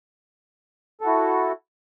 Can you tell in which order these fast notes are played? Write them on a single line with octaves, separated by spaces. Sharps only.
A4 F#4 E4